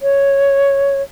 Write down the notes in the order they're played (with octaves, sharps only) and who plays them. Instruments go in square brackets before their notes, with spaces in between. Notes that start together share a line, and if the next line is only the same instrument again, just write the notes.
[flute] C#5